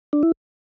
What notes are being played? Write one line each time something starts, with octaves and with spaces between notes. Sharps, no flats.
D4
E4